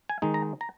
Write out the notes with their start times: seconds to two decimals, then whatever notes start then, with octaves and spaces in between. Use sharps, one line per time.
0.09 G#5
0.22 D#3 G#3 D#4
0.34 A#5
0.61 A#5